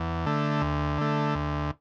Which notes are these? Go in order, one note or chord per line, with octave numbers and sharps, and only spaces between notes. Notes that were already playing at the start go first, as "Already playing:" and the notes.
Already playing: E2
D3 A3
D2
D3 A3
D2